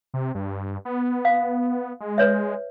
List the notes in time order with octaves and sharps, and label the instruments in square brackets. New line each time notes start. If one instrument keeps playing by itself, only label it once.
[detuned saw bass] C3
G2
B3
[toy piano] F5
[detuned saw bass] G#3
[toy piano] B4 C#5 E5